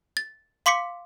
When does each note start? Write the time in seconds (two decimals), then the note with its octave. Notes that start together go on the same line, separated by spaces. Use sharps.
0.17 A6
0.66 F5 C6 D6 B6 C#7